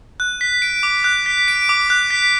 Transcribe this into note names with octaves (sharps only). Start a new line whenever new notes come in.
F#6
B6
D7
D6
F#6
B6
D7
D6
F#6
B6